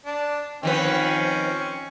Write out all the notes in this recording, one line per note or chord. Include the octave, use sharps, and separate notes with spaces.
D4
D#3 F3 C4 C#4 B4